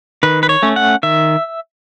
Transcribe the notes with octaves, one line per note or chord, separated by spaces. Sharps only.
D#3 B4
B4
C#5
A3 C#4
F#5
D#3 E5